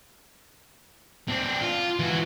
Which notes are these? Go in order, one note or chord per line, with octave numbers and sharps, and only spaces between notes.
C4 D4
F4
E3 F#4